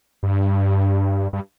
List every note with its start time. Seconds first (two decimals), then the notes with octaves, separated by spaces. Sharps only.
0.23 G2
1.33 G2